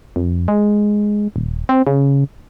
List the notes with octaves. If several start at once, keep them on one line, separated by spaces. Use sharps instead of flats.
F2
G#3
D#1
C4
C#3